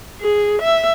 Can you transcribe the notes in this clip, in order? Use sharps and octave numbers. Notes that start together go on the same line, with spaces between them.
G#4
E5